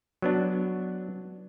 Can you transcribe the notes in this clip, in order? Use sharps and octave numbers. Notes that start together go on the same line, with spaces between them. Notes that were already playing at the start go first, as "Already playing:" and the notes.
F#3 B3 D4